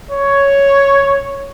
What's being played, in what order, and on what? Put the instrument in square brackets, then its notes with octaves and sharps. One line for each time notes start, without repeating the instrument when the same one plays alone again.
[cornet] C#5